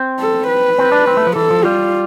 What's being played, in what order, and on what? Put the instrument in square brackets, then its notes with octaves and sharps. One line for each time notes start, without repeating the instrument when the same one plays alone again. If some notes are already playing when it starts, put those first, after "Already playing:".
Already playing: [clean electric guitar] C4
[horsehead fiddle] A4
B4
[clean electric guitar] C4
D4
C4
A3
F3
[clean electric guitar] E3 [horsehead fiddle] A4
[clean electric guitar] F3
[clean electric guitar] G3 [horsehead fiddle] F4